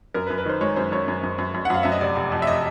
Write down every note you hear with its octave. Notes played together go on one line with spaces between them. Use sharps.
F#2 A#4
B4
F#2
B4
D#3 C5
G#3 C#5
F#2 C5
F#2 C#5
F#2
F#2
F#2
F#2
F#5
F#2 F5
F#2 E5
D#5
F1 D5
F1
F2
E5
D#5